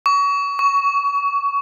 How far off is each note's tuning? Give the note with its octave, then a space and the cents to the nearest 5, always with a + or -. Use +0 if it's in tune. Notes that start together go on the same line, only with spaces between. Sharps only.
C#6 +30
C#6 +15